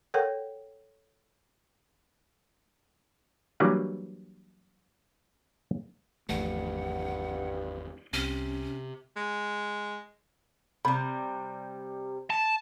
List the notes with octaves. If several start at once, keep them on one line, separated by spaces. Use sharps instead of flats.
A4 A#4 C#5 F#5 G5
E3 F#3 G3 A#3 D4 B4
G#1 E2 G2 F3 A3 F#5
C2 C3 C#4
G#3
C3 G3 B5
A5